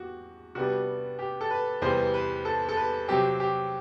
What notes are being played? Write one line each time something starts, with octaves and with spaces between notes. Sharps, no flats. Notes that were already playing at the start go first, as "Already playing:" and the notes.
Already playing: E2 F#4 G4
C3 G3 B3 D4 F#4
G4
A4
B4
E2 C3 G3 B3 C5
B4
A4
A4
B4
C3 F#3 C4 G4
G4